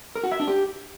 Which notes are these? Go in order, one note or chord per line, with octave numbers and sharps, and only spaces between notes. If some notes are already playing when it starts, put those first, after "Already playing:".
A#4
F#4
E5
D4
G4